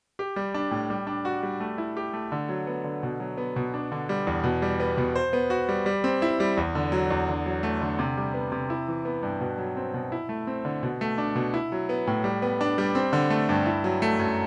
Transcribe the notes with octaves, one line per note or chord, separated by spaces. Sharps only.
G4
G3
D4
A2
G3
D4
F#4
G3
A3
E4
G4
A3
D3
F#3
B3
D3
B2
F#3
B3
B2
D4
D3
G3
E2
B2
G3
B3
B2
C5
B3
F#4
G3
G3
C4
E4
G3
E2
D3
F#3
E2
D3
F#3
A3
D3
C3
G3
B3
C3
E4
E3
B3
G2
B2
F#3
C4
B2
E4
A3
C4
D3
B2
A3
D4
B2
E4
F#3
B3
A2
G3
B3
D4
G3
C4
D3
A3
G2
E4
F#3
A3
F#2